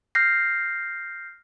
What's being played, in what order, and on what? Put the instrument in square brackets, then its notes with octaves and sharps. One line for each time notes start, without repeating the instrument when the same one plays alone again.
[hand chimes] F6 G6 A#6 C7